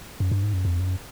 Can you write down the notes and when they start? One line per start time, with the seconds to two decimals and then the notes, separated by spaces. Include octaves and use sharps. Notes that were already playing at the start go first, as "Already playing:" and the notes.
0.20 F#2
0.32 G2
0.43 G#2
0.54 F#2
0.65 F2
0.80 F#2